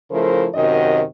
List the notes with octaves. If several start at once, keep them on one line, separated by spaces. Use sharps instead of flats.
C#3 F3 A3 E4 A#4 C5
F#2 C3 D#3 F#4 D#5